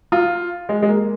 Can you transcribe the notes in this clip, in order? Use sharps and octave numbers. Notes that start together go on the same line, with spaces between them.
F4
G#3
G#3
A#3